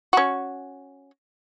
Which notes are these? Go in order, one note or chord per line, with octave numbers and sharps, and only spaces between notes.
C#4 F#4